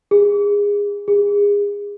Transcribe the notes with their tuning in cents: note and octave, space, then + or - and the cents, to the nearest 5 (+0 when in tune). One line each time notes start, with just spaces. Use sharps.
G#4 -25
G#4 -30